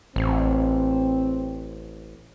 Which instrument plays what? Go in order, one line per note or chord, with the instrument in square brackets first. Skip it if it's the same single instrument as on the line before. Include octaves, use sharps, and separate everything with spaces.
[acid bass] A1 [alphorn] C4